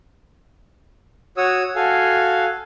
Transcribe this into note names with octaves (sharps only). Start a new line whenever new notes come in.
F#4 C#5 D#6 E6
F#4 A4 F5 G#5